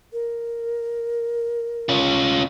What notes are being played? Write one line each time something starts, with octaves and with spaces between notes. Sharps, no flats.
A#4
C#4 F4